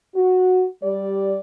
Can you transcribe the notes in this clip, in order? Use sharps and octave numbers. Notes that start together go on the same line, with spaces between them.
F#4
G3 G4 D5